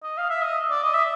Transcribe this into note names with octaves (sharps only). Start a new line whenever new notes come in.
D#5
F5
E5
D#5
D5
D#5
E5